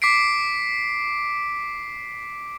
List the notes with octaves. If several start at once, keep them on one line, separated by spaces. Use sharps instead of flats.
D6 B6 C7 D7